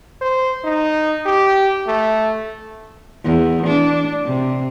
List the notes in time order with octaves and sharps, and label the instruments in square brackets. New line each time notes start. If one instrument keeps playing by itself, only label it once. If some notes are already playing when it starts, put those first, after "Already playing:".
[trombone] C5
D#4
G4
A3
[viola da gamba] E2
D4
C3